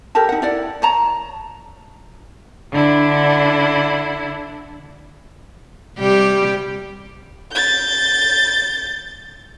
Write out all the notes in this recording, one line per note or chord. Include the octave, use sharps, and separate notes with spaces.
G4 A4 A#4 A5
D#4 F#5
E4 D5 F#5
C#5 A5 A#5
D3 D4 E4
C3 G3 G4
G6 A6